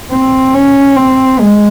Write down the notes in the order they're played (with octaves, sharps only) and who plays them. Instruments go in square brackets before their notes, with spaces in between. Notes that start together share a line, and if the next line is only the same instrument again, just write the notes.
[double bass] C4
C#4
C4
G#3